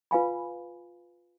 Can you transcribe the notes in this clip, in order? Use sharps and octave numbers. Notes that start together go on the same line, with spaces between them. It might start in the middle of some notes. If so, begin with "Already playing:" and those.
F4 B4 F5 G#5 B5